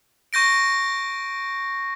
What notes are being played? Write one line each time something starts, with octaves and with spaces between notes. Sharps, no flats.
C#6 G6 A#6 D7